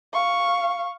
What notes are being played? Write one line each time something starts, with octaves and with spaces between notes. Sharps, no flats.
F5 C#6